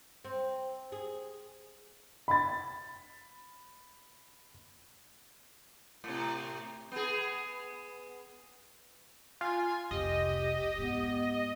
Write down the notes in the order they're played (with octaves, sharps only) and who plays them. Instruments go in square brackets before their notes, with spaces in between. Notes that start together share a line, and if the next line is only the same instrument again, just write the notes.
[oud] C4
G#4
[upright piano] B5 A6
[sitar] A2 C3
B3 G#4
[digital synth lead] F4 [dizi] G#5
[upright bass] F1 C2 [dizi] G4 [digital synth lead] D#5
[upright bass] G#2 [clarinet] B3